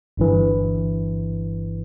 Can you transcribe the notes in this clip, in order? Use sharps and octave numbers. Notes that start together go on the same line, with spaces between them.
G1 G2 E3